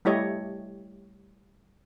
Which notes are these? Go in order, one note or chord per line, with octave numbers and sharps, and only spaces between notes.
G3 A3 E4 G4 C#5 D#5